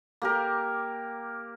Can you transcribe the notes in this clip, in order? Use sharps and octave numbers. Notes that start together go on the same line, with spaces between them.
A#3 G4 A#4